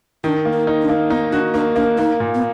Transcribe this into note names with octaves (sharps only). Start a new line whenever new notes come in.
D#3 D4
A#3
D#4
D#4
D4
A#3
B3 D#4
D4 F#4
A#3 D4
A#3 D4
A#3 D#4
A#2
B3